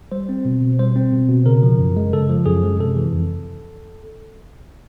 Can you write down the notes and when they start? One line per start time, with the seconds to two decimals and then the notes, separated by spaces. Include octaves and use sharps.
0.12 G3 C5
0.29 C4
0.45 B2
0.61 B2
0.79 G3 C5
0.96 C4
1.12 B2
1.29 B2
1.46 C#3 A#4
1.63 F3
1.79 F#2
1.97 G#3
2.13 C#3 A4
2.29 F3
2.46 F#2 G#4
2.64 G#3
2.80 C3 A4
2.97 E3
3.13 F2